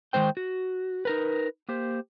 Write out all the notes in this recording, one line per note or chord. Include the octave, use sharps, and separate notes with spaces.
D#3 G3 G#3 C5 G5
F#4
D#4 A#4 B4
A#3 G4 C5